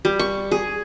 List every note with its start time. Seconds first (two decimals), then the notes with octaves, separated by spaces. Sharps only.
0.05 G3
0.19 C#6
0.51 G#4